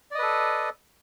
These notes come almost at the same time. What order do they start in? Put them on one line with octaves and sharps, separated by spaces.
D5 D#5 B4 A4